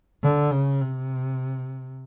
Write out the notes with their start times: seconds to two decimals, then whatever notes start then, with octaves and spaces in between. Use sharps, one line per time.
0.23 D3
0.52 C#3
0.81 C3